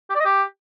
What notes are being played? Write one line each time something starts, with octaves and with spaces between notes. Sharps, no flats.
G4
D5
D#5
G4